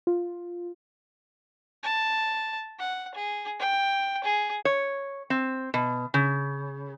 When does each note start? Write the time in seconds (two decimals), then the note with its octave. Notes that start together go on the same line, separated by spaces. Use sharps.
0.07 F4
1.83 A5
2.79 F#5
3.14 G#4
3.59 G5
4.24 G#4
4.65 C#5
5.30 C4
5.74 B2
6.14 C#3